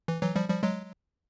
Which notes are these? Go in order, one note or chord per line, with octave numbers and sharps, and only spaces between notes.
E3
E3 F#3
F3 G3
F3 G3
F#3 G#3